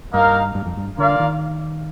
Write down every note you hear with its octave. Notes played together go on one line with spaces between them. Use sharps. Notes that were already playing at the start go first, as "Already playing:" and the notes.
G2 A#3 D#4 A#4 F5
G2
F2
G2
D3 A#3 F4 A#4 D5 F5
D#3